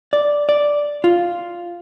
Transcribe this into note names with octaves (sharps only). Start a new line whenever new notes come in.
D5
D5
F4